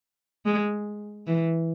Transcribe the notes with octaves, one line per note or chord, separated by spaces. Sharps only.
G#3
E3